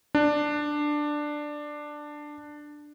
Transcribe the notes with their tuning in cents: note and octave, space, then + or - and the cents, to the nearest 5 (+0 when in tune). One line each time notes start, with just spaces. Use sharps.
D4 +10